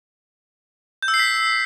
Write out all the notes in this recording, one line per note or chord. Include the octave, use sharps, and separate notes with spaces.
G6
E6
C7
B6